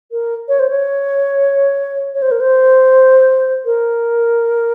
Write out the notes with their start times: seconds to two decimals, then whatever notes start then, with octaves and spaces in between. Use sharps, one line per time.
0.12 A#4
0.49 C#5
0.59 C5
0.70 C#5
2.14 C#5
2.22 C5
2.31 A#4
2.40 C5
3.66 A#4